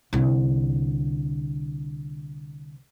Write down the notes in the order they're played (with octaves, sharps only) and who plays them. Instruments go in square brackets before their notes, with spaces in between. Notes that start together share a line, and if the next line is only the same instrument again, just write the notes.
[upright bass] C2 D3